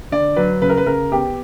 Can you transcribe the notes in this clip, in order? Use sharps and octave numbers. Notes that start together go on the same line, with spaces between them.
D3 D5
F#3 B4
C#3 B4
A#4
B4
C#3 A#4
B3 G4